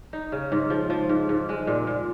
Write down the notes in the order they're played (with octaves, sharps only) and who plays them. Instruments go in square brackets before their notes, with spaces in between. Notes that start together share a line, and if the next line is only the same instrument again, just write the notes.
[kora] D#4
C#3
G#2
F3
F3
G#2
G#2
G#3
A#2
A#2